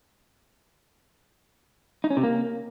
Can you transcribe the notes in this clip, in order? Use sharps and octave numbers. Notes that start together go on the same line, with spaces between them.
D#4
C#4
C3
A#3